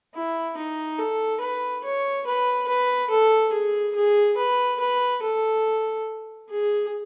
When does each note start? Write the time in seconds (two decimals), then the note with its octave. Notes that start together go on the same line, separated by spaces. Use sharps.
0.14 E4
0.57 D#4
0.98 A4
1.41 B4
1.84 C#5
2.26 B4
2.68 B4
3.10 A4
3.52 G#4
3.95 G#4
4.37 B4
4.80 B4
5.22 A4
6.49 G#4